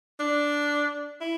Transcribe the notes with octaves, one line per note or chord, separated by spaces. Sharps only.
D4
E4